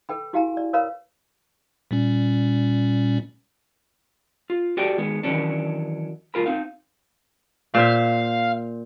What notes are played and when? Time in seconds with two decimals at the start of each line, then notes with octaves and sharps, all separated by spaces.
0.09 A4 B4 G5 B5
0.33 E4 F#4 G4 F5 G#5 A#5
0.57 D5
0.73 A#4 B4 C#5 F5 A#5 B5
1.91 A#2 G3 C#4
4.50 F4
4.77 F#4 G4 A4 D5 D#5 G5
4.98 D#3 G#3 B3
5.23 D#3 E3 F#3 C#4 D4
6.34 C#2 F4 A#4 B5
6.46 C4 D#4 F5
7.75 A#2 C5 E5 F5